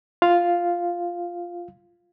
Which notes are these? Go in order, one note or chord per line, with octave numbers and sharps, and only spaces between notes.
F4 F5